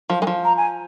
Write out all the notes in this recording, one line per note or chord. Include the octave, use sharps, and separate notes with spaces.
F3
G#3
F3
A#5
G#5